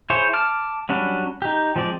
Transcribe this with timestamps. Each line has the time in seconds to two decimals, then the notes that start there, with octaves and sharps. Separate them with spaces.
0.10 E4 G#4 C5 C#5
0.33 A5 D6 F6
0.89 F#3 G3 C#4 D4
1.42 D#4 G4
1.76 F3 G#3 C4 D5